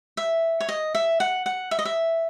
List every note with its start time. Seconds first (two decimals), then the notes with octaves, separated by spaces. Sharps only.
0.17 E5
0.60 C#5
0.69 D#5
0.95 E5
1.20 F#5
1.46 F#5
1.71 E5
1.79 D#5
1.85 E5